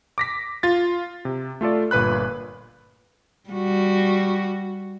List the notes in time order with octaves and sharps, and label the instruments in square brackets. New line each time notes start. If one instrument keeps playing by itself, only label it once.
[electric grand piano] D6 A#6 B6
F4 A6
C3
A3 F4 A4 D5
G1 A#2 B4 B5 F#6
[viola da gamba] G3 F#4